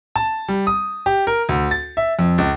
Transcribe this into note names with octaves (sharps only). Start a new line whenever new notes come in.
A5
G3
D#6
G4
A#4
D2
A6
E5
F2
C#2